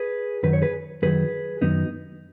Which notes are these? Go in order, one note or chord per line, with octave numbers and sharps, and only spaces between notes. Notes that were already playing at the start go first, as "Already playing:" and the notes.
Already playing: G#4 B4
F#2 D#3 F#3 B4
C#5
G#4 B4
F#2 D#3 F#3 G#4 B4
F#2 D#3 F#3 B3 D#4